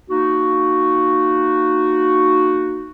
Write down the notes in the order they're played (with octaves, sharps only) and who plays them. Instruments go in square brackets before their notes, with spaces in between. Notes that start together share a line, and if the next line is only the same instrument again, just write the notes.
[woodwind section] A#3 D#4 F#4